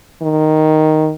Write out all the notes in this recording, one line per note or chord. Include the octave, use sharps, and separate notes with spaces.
D#3